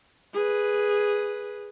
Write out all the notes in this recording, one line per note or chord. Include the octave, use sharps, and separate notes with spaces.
G#4 B4